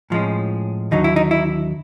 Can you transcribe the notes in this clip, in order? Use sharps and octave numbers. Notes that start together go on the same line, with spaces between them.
A2 F3 G#3 C#4
D#2 D3 F#3 D#4
E4
D#4
E4